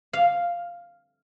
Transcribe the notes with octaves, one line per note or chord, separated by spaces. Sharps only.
F5